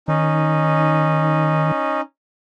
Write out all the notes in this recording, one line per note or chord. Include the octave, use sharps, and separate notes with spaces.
D#3 C#4 D#4